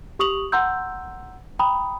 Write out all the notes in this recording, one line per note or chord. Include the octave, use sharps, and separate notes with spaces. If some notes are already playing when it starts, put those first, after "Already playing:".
G4 C#6 D#6 F7 F#7
F#5 A#5 C6 E6 G6
G5 A#5 B5 D#6